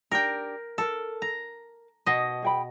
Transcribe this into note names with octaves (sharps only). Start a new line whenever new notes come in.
D4 G4 A#4 G5
A4 A#4 A5
A#5
B2 D#5
G#4 G5 B5